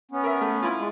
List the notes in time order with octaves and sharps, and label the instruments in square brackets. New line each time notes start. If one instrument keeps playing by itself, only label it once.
[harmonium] B3 C#4
[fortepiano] A#4 E5
A3
E4 F4
[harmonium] G#3